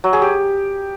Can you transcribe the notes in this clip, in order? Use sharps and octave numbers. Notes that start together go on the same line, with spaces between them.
F#3
G#4
G4